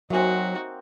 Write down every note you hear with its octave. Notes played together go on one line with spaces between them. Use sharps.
F#3 A#3 C4 D#4 F#4 E5 G#5